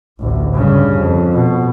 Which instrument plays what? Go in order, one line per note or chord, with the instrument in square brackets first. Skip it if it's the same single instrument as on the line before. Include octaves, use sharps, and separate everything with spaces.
[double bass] A1 D2
G2 C#3
F2
B2